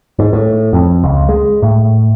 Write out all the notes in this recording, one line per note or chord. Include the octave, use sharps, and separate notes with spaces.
G#2
A2
F2
C#2
G#3
A2